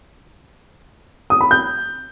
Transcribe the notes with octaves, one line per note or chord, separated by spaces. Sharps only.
D#6
B5
G6